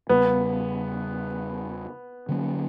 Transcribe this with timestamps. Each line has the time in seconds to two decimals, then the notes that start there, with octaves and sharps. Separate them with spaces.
0.09 E2 C#3 G3 B3
2.29 D3 F#3 A#3 C#4